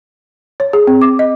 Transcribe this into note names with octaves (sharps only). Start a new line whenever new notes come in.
C#5
G#4
C4
D6
D#5